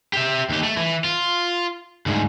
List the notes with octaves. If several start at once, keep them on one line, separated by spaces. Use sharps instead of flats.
G4 E5
D#2 G4
A3
E3
F4
D2 G#2